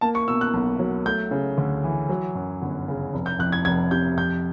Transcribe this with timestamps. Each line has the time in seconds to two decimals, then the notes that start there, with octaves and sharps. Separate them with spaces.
0.01 A#3 A5
0.15 C#6
0.28 B2 E6
0.41 F#6
0.53 B1
0.79 F#3
1.05 A3 G6
1.31 C#3
1.58 D2
1.84 E3
2.09 F#3
2.35 F#2
2.62 G1
2.88 C#3
3.13 F1
3.26 G6
3.39 F2 F#6
3.52 G#6
3.65 F1 G#6
3.91 C3 G6
4.17 F2 G6